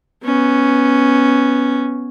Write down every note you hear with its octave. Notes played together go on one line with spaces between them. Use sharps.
B3 C#4